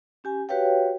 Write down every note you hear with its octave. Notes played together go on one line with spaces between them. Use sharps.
C#4 G4 G#5
F#4 G4 B4 C#5 F5 G5